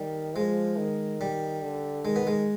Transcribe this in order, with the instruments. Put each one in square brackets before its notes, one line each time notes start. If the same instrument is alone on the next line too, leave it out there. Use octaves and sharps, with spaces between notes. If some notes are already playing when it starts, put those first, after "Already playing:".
Already playing: [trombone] D#3 [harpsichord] G3
[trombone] F3 [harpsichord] G#3
[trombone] D#3
[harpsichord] G3
[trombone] D3
[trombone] D#3 [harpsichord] G#3
[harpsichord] B3
G#3